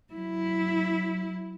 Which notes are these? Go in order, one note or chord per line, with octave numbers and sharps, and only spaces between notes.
F#3 E4